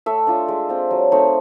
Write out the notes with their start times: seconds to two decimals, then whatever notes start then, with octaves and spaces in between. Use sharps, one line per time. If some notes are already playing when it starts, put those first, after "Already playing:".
0.06 A3 E5
0.27 D4 F4
0.48 G#3
0.69 C4 F4
0.91 F#3
1.12 A3 C4 D#4